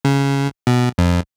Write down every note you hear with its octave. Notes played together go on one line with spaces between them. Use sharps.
C#3
B2
F2